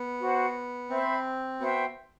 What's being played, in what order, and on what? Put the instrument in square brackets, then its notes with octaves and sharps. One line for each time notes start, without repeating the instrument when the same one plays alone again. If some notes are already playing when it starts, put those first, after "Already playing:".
Already playing: [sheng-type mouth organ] B3
[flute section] F#4 C5 F#5
[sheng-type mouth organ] C4 [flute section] C5 E5 B5
[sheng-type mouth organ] B3 [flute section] F#4 C5 E5 G5